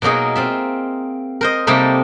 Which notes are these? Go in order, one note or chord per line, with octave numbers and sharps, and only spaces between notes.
B2 F#3 A#3 D#4 G#4
C4 F4 E5
A#4 C5 D#5
C3 G3 A3 A#3 D#4 C5